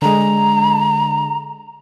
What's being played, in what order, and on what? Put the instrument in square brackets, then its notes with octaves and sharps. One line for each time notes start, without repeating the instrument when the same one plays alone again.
[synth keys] D3 G#3 [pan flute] A#5